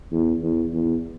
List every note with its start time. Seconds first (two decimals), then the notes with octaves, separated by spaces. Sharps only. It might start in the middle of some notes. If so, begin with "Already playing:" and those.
0.12 E2
0.43 E2
0.73 E2